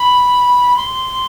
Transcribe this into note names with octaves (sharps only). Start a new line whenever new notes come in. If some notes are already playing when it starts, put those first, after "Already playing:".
Already playing: B5
C6